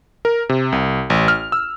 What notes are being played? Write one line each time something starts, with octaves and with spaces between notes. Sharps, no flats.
A#4
C3
C2
A1
F6
E6